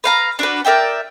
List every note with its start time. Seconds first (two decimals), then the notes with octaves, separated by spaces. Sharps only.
0.04 B4 F5 A#5
0.39 D4 F#4 B4
0.65 A#4 D5 E5 G5